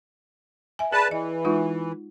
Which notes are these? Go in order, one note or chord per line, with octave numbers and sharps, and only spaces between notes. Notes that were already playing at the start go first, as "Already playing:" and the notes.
E5 G#5
G#4 B4 D5 A5
E3 D#5
G#3 D#4 F4